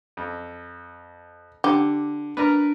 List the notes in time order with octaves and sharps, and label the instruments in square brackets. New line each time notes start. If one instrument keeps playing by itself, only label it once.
[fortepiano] F2
[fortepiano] D3 [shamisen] G4
[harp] D4 A#5 F6 [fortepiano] A#4 B4